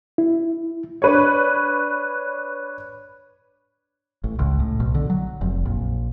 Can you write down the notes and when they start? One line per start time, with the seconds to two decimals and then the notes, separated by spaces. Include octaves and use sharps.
0.18 E4
1.02 D4 B4 C#5
4.24 A1
4.39 C#2
4.60 A2
4.80 B1
4.95 D3
5.10 F#3
5.41 F1
5.66 A#1